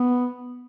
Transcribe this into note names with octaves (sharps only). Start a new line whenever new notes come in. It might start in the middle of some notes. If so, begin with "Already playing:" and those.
Already playing: B3